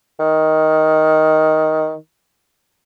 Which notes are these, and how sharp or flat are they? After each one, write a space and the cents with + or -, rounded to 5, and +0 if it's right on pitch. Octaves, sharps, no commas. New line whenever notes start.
D#3 +10